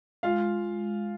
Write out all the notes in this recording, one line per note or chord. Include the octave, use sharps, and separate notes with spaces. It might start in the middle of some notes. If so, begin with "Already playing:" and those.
G#3 F4 F5